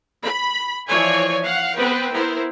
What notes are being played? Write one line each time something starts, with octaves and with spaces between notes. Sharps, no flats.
B5
E3 F3 C#5 D5 G#5
F5 F#5
B3 C4 B4 C5 G5
B3 E4 A#4 C5